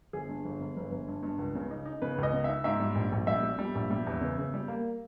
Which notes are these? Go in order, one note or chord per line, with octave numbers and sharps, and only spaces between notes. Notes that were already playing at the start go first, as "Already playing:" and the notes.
G1 G#4
G2
G1
G1
G1
G1
G2
G2
C#2
C#3
D#4
D#4
C#3 B4
C#2 D#5
C#3
D#4 E5
G#2 E5
G3
A#1
A#1
G3 E5
G3
G3
A#1
G3
E2
C#3
C#3
G3
A#3